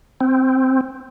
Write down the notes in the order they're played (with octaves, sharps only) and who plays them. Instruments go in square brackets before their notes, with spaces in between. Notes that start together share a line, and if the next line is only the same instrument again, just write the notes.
[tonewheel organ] C4